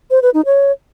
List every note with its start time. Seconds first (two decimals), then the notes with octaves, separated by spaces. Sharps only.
0.11 C5
0.22 B4
0.34 D#4
0.46 C#5